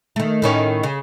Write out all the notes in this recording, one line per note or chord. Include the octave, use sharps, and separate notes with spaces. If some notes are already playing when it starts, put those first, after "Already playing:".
D#3 A3
A2 D#3 C#4
C#3